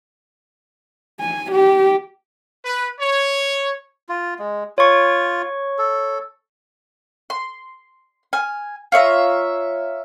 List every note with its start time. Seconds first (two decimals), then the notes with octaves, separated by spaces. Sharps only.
1.20 G#5
1.52 G4
2.65 B4
3.00 C#5
4.09 F4
4.39 G#3
4.78 F4 C#5 C#6
5.79 A4
7.30 C6
8.33 G#5 F6
8.92 F4 C#5 E5 A#5